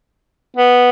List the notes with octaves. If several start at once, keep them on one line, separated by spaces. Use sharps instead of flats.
B3